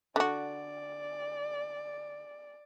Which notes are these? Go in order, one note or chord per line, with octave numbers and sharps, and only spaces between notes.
D3 F#4 D5